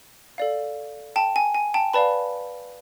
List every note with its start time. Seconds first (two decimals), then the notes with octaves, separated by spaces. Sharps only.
0.38 A4 D5 F5
1.16 G5 A5
1.36 G#5
1.54 G#5
1.74 G5 A5
1.93 B4 D5 F5 A5 B5